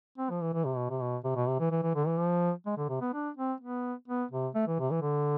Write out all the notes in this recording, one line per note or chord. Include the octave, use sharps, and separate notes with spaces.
C4
F3
E3
E3
C3
B2
C3
B2
C3
B2
C3
E3
E3
E3
D3
E3
F3
G#3
D3
C3
B3
D4
C4
B3
B3
C3
A3
E3
C3
E3
D3